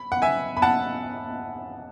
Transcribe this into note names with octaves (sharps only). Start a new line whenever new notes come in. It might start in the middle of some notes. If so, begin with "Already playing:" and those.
Already playing: B5
F#5
E5 G#5
B5
F#5 A5